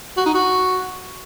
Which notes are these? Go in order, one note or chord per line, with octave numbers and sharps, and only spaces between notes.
F#4
D#4
F#4